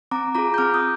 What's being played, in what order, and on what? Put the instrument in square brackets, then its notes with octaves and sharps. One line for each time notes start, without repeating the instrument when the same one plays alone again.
[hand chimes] C4 A#5 D6
F4 G#4 A#5 D6
G6
C4 D6 F6
D#6 G6